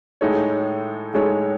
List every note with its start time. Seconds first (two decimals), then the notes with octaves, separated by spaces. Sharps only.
0.21 A2 G#3 D#4 A4 C#5
1.13 A2 G#3 D#4 A4 C#5